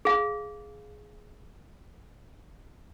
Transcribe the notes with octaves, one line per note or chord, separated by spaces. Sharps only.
G#4 F5